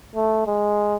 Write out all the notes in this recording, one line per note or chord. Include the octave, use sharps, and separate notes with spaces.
A3
G#3